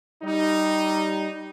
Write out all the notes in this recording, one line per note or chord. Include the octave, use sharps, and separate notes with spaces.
G3 D#4